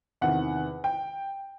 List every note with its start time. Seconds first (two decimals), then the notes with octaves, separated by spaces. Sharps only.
0.21 E2 C3 D#3 F#5
0.84 G5